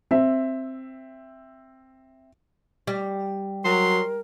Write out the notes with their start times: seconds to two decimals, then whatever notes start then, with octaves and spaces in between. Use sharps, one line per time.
0.11 C4 E5
2.87 G3
3.65 F#3 A#4 C6